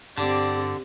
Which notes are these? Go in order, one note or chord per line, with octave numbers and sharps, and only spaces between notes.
G2 D3 C4 G4 D5